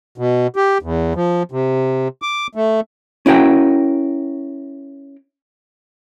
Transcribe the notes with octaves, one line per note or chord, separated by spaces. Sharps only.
B2
G4
E2
F3
C3
D6
A3
C#4 E4 F#4 A#4 G5